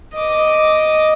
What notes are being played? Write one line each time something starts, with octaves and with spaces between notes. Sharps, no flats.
D#5 D6